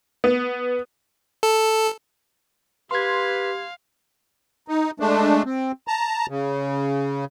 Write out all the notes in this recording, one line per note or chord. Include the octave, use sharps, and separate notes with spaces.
B3
A4
G4 B4 F5 C6 G#6
D#4
G#3 A3 D4
C4
A5 A#5
C#3